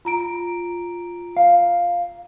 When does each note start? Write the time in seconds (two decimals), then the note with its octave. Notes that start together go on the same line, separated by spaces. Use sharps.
0.05 F4 A#5 D7
1.37 F5